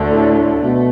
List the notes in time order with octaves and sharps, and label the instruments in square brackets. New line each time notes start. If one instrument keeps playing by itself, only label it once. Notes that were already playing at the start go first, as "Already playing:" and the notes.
Already playing: [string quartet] D2 D3 A3
[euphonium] A2
[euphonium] B2 [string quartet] A3